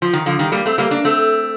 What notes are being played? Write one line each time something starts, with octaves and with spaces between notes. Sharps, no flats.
F3
D#3
D3 F3
D#3 G3
G3 A#3
A3 C4
G3 A#3
A#3 D4
A3 C4